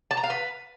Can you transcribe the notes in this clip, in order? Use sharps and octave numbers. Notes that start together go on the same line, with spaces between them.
A5
A#5
F5
B4